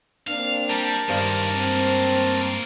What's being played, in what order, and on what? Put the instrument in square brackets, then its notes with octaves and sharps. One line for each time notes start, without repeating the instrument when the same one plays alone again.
[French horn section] A#3 C4 D4 [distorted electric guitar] F5
[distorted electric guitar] G3 [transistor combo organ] A#4 A5
[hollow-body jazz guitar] G2 C5 F5 [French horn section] D#3 [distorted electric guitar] G#3 A#3
[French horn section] C4